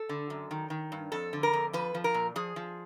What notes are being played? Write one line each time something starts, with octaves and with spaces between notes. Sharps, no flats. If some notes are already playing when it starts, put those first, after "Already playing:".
Already playing: A4
D3
F#2
D#3
D#3
G2
F2 A4
D3
A#4
F2
F3 B4
F3
A#4
A#2
F3 G#4
F3